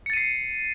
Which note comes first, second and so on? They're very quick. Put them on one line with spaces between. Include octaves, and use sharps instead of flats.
C#7 A6 D#7 C7